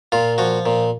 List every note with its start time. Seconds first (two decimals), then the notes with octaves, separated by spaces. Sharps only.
0.12 A#2 F4
0.38 F3 F#4
0.66 A#2